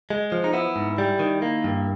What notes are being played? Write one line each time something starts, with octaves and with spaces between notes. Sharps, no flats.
G#3
F3
D#4
B3 E4
G#2
G3
D#3
A#3
G2